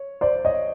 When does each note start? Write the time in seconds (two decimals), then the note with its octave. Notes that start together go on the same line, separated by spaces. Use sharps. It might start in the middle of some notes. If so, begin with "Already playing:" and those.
Already playing: C#5
0.21 C5 D5
0.45 C#5 D#5